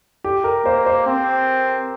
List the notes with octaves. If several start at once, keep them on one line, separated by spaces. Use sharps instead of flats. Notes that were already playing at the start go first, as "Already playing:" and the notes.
G4
A#4
A#3 C5
C5
C4